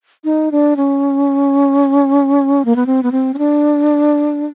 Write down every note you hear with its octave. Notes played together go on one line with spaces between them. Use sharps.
D#4
D4
C#4
A#3
B3
C4
B3
C4
C#4
D4